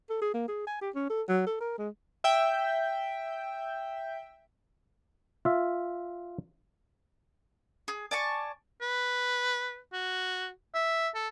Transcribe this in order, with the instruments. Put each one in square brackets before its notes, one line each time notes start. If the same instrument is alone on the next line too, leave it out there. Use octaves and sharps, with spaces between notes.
[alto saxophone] A4
G#4
A#3
G#4
G#5
G4
C#4
A4
F#3
A4
A#4
G#3
[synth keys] E5 G5
[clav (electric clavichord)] F4 E5
[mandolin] G#4
D5 G#5 A5 C#6
[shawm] B4
F#4
E5
A4